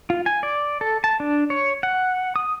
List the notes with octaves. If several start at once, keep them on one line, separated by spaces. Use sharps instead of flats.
F4
G#5
D5
A4
A5
D4
C#5
F#5
D#6